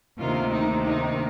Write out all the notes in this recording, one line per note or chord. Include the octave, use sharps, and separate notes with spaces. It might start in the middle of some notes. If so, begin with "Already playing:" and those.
D2 C3 D#3 A#3 F4
D#4
D#4